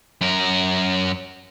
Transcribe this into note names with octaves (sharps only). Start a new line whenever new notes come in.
F#2 A#4